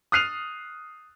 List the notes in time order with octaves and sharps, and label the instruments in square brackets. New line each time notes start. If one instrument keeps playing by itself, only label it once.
[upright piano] D#6 F6 F#6 C7 D#7 F7